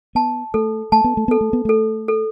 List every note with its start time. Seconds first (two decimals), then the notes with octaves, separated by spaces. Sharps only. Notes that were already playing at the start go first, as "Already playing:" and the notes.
0.15 B3 A5
0.54 A3 A4
0.92 A3 A5
1.04 B3
1.17 A3
1.28 B3 A4
1.41 A3
1.53 B3
1.65 A3 A4
2.08 A4